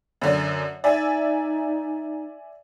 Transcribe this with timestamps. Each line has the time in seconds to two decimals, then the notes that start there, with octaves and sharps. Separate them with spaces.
0.21 F#2 D3 D5
0.84 D#4 D5 E5 G#5